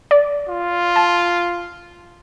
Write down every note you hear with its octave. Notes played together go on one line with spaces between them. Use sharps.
D5
F4
A5